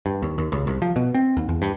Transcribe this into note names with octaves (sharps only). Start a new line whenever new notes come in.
G2
D#2
D#2
C#2
C2
F3
B2
C4
D#2
E2
G2